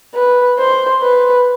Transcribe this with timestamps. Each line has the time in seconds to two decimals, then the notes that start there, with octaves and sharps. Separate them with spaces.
0.15 B4
0.58 C5
1.02 B4